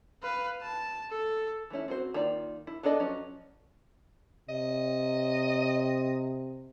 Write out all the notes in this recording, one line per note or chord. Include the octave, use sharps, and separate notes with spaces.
B4 F5
A5
A4
E3 A3 C#4 E4
C4 F#4 C5
D#3 A#3 F4 D5
E4
B3 D4 A4 D5 D#5
F3 F#3 C#4
C3 D#5